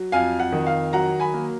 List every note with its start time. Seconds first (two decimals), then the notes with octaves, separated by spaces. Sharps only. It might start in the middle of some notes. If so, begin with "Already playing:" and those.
Already playing: F#3
0.12 F2 F5 G#5
0.40 F#5
0.52 D#3
0.67 F5
0.93 F#3 F#5 A#5
1.20 G#5 B5
1.34 A#3